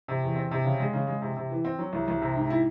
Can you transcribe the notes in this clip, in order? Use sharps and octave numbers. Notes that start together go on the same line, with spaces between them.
C3
E2
C4
C3
C#3
G#3
C#3
G#3
C3
C3
E3
C4
F#3
C2
C2
C3
G#2
E4